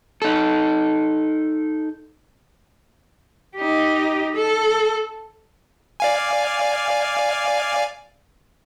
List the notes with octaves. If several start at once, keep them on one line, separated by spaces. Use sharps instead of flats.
D#4 A4
D#4 G4
A4
D5 F5 G#5